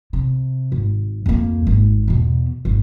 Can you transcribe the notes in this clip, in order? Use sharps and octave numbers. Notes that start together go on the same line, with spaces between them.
C3
G#1
F2 A#3
G#1
E2 B2
G#1